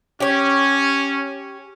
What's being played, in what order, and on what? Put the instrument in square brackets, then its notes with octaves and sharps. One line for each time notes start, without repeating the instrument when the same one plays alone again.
[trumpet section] C#4 [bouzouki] G4 C#5